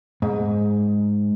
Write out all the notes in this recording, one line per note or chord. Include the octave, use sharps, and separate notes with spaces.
G#2